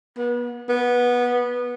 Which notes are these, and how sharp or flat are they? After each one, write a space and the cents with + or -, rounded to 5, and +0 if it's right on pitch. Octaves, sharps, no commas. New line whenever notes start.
B3 -35
B3 -15